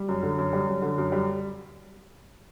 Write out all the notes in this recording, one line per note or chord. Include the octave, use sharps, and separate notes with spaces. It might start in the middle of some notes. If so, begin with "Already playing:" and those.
Already playing: G3
F#2
D3
F#2
G3
F#2
D3
F#2
G3